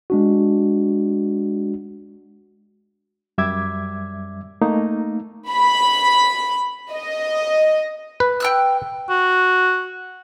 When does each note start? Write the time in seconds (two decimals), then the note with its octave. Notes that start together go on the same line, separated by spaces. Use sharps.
0.10 G#3 D4 F#4
3.38 F#2 G3 E5 D6 G#6
4.61 A3 A#3 D#4
5.51 B5
6.93 D#5
8.20 B4
8.40 G5 E6 F#6
9.10 F#4